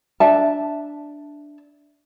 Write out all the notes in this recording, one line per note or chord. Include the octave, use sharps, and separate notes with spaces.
D4 E5 A5